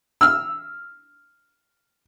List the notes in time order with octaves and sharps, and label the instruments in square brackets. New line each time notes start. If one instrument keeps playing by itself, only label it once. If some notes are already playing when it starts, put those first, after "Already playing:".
[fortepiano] E6 F6